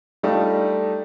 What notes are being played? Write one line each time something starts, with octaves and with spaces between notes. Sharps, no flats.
G3 A3 D4 D#4 F4